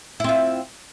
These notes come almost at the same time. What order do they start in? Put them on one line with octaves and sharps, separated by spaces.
E4 C4 F4